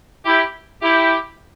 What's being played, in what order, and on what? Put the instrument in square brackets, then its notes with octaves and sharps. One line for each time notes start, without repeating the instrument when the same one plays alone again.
[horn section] E4 G4
E4 G4